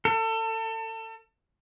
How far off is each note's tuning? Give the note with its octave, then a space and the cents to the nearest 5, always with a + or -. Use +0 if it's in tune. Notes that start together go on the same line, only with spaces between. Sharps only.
A4 +30